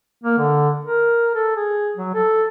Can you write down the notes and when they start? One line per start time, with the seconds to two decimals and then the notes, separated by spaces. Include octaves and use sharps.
0.24 A#3
0.38 D3
0.85 A#4
1.35 A4
1.56 G#4
1.97 F#3
2.15 A4